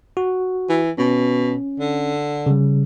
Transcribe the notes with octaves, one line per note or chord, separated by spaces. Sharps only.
F#4
E3
B2 C#4
D3
C#3 G3